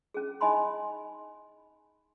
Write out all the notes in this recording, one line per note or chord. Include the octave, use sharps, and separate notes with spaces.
C#4 G#4
D#4 D#5 G#5 B5 C6